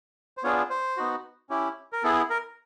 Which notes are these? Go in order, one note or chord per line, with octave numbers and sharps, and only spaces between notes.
C5
B3 D4 F4 G#4 C#5
C5
B3 D#4 F#4
C#4 E4 G4
A#4
B3 E4 G#4 A4
A#4